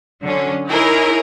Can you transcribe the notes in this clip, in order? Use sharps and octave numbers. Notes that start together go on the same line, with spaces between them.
D3 F#3 C#4
D#4 E4 G#4 A#4 C#5